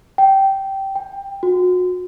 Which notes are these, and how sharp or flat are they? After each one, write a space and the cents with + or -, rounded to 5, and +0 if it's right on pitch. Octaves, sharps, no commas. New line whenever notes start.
G5 -15
G5 +15
F#4 -30